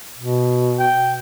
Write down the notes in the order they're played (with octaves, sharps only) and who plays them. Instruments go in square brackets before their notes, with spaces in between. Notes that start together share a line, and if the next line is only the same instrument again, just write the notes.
[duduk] B2
[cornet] G5